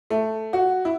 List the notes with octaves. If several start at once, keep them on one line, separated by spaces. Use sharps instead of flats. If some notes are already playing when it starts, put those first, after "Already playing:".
A3
F#4
E4